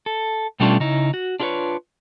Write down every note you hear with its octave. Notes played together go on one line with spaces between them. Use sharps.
A4
B2 G3 A3 C#4 D4 F4
C#3 D#4 E4
F#4
D4 F4 G#4 A#4 B4 C#5